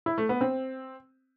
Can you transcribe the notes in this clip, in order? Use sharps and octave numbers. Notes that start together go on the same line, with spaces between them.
E4
A3
B3
C4